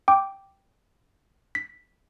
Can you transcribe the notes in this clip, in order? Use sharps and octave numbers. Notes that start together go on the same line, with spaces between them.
G5 D6
B6